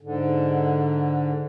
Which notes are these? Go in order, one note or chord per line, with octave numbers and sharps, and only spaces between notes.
G#2 D3